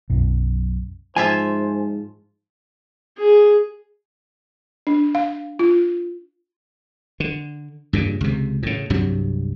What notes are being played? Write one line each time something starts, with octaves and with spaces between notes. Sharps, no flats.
B1 F#2
G#2 F3 F4 C5 E5 G#5
G#4
D4
F5
F4
D3
G2 A#2 C#3
C#2 C3
A2 C#3
C2 G2 C3 F#3